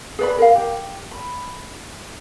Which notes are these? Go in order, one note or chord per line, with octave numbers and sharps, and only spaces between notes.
G#4 B4 D5 B5
A#4 F5
G4
B5